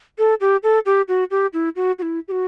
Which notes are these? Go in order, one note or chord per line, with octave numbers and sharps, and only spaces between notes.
A4
G4
A4
G4
F#4
G4
E4
F#4
F#4
E4
G4
F#4